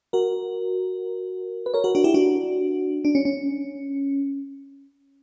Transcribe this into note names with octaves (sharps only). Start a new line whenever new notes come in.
F#4 A#4
B4
A#4 C#5
F#4 A#4
D4 F#4
E4 G4
D4 F#4
D4
C#4
C#4